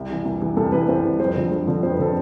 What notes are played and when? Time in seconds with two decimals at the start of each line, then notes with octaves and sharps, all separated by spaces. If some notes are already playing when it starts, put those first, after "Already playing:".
Already playing: C2
0.09 C3 E3
0.25 C2
0.41 C3 E3
0.57 C2 A4
0.72 C3 E3 B4
0.88 C2 C5
1.04 C3 E3
1.20 F2 C5
1.36 D3 F3 C4
1.51 F2
1.67 D3 F3 C4
1.83 F2 C5
1.92 B4
1.98 D3 F3 C4 A4